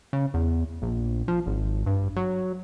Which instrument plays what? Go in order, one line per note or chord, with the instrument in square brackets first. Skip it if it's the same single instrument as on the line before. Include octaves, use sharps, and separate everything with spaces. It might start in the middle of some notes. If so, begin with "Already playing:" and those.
[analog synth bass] C#3
E2
A#1
F3
G#1
G2
F#3